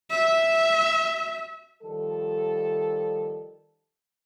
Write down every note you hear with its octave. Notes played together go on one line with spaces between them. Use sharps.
E5
D#3 F3 G3 A4